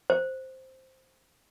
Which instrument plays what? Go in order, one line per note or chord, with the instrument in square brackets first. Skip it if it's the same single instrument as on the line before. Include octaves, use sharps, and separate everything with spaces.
[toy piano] C5